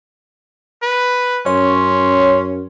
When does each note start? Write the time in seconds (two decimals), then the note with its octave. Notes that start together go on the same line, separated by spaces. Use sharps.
0.82 B4
1.46 F#2 C#4 C#5 C6